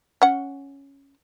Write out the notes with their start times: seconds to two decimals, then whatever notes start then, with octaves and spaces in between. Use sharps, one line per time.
0.22 C#4 F#5